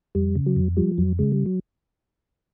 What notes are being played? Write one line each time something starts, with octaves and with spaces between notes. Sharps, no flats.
F2 G3
C#3
F#3
F2
F3 G3
F2 F#3
C#3 G#3
G3
F#3